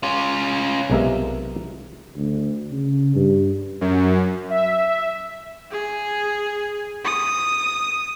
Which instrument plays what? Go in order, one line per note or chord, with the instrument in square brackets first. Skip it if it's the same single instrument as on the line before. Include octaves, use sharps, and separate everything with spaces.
[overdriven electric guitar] C#4 F4
[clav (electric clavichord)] B1 C3 G#3 A#4 E5
[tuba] D2
C#3
G2
[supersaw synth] F#2
[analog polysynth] E5
[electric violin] G#4
D#6